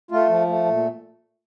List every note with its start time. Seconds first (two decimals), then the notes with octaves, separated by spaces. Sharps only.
0.11 A3 F4
0.29 F3
0.47 A3
0.65 A#2